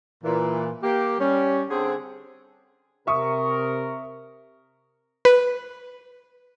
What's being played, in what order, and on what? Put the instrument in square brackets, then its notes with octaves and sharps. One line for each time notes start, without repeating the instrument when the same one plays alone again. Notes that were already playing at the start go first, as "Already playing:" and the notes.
[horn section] A#2 E3
A#3 G4
G3 C#4
D3 C4 G#4
[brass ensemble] C3 A#4 [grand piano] E5 C#6 D#6
[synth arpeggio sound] B4